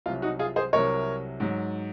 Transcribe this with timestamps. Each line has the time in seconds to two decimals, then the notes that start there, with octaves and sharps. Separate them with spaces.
0.06 C2 C3 F#3 F4
0.22 D#4 F#4
0.39 F4 G#4
0.56 G#4 C5
0.73 C2 C3 F#3 A#4 C#5
1.40 G#2 F#3